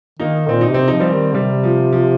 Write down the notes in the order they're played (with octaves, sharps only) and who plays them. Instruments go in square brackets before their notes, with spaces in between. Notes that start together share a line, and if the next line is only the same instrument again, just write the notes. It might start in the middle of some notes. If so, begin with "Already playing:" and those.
[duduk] D#3 [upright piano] A#3 D#4
[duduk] A#2 [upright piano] C4
[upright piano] D#4
[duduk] C3 [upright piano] C4
[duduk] F3 [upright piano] D#4
[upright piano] G3 C4
[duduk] D#3
[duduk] C3 [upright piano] G3
[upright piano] F3
F3